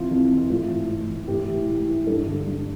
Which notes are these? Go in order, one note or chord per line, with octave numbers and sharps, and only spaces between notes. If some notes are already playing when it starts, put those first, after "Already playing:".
Already playing: F2 C3 E3 F4
F2
C3 E3
A2 F4
E3
A2
E3
A2 G4
E3
A2
E3
G2 A4
D3
G2